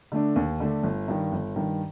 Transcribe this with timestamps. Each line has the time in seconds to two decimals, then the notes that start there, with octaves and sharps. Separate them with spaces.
0.12 D3 A3 D4
0.36 D#2
0.60 D3 A3 D4
0.83 G1
1.08 G2 D#3
1.32 G1
1.56 G2 D#3